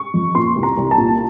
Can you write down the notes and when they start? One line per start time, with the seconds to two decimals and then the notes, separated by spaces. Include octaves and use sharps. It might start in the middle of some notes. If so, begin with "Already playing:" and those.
Already playing: C#6
0.14 F2
0.35 A#2 C6
0.56 C2
0.63 A#5
0.78 C2
0.91 A5
0.98 A#2